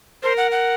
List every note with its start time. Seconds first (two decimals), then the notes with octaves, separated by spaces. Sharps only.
0.23 A#4 C5
0.37 F#5
0.51 F#5